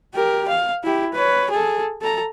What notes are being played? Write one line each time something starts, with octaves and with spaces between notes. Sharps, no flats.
G4 A#4
F5
E4 G4
B4 C#5
G#4 A4
A4 A#5